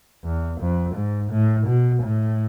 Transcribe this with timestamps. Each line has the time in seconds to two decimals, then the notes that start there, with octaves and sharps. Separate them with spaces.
0.24 E2
0.60 F2
0.95 G#2
1.31 A2
1.66 B2
2.03 A2